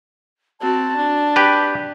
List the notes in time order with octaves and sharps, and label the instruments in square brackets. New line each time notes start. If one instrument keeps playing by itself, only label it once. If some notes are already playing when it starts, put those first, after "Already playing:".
[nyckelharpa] C4 F#4 [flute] A5
[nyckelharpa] D4
[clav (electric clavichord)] G4 B4